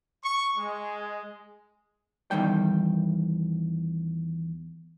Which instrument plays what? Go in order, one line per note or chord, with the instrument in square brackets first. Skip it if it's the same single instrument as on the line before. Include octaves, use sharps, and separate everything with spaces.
[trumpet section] C#6
G#3
[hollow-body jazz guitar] E2 D#3 G3 G5